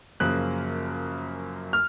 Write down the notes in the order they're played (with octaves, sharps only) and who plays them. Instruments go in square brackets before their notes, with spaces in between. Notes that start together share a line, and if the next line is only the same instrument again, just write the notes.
[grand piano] F#2 C#3 F3 A#3 [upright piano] F#6
[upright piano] F6